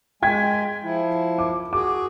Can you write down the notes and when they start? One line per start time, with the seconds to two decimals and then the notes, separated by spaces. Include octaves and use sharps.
0.23 G#3 G5 G#5 G#6 B6
0.83 F3 E4
1.38 D6
1.73 F#4 G#4 D6